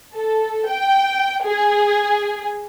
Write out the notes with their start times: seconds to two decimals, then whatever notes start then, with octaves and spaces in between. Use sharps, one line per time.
0.16 A4
0.70 G5
1.45 G#4